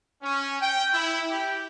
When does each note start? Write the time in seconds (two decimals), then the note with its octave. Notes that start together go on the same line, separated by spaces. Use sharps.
0.22 C#4
0.61 G5
0.94 E4
1.30 G4